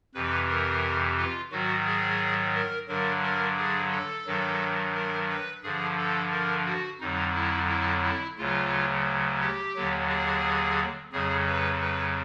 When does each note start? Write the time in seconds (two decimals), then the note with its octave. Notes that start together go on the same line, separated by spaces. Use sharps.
0.15 F2 C3 E3 B4
0.49 A#4
1.17 F4
1.52 G#2 D#3 F#3 F#4
1.86 G#4
2.55 A#4
2.88 G2 D3 F#3 A#4
3.23 A#4
3.57 G#4
3.92 A4
4.26 G2 D#3 F#3
4.95 A#4
5.29 B4
5.63 G2 D3 F3 G#4
5.97 A4
6.32 A#4
6.66 F#4
7.00 F2 D3 F#3 D#4
7.35 E4
7.69 E4
8.03 E4
8.38 D2 C#3 F#3 F4
9.41 G4
9.75 D#2 D3 F#3
10.09 G#4
11.12 F2 C#3 F#3 G#4
11.47 B4
11.81 B4